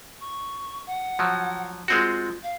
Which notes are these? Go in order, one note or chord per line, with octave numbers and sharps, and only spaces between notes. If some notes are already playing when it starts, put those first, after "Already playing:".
C#6
F#5
F3 F#3
G#3 C4 F4 F#4
F5